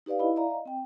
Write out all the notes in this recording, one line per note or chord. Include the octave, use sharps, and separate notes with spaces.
D#4 G4 B4 D5 F5
E4 D#5 B5
D5 E5 F5 A#5
D#5
C4 G5